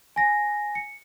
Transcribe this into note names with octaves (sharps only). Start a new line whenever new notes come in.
G#5 A#6
C#7